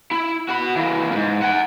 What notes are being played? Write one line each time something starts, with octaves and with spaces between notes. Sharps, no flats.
E4
F#4 B5
E3 A#3
F2 G#2
F#5 G#5